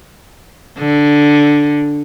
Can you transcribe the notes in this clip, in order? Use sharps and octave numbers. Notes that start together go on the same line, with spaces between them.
D3